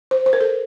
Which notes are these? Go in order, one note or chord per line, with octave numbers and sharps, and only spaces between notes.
C5
C5
A#4
A4